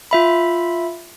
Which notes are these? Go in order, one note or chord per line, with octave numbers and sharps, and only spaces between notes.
F4 E5 B5